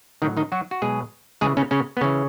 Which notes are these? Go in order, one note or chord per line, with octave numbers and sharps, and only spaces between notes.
A2 D#3 F#3 D#4
D#3 D#4
F#3 F#4
F#4
B2 F#3 G#3 G#4
C#3 E3 G#3 G#4
C#3 C#4
C#3 C#4
B3
C#3 E3 C#4